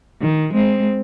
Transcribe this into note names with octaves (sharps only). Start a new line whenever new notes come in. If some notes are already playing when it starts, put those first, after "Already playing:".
D#3
G#3 C4